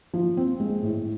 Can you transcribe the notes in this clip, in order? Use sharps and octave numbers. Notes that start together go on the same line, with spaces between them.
F3
C4
G#3
A2